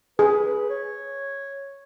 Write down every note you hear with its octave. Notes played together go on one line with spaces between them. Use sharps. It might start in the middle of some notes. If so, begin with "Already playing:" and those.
G#4 B4
B4
C#5